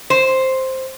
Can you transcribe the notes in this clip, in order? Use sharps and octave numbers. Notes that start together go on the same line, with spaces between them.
C5